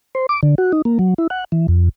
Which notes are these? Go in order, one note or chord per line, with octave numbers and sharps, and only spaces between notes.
C5
D6
D3
F#4
D#4
A#3
F#3
E4
F#5
E3
F2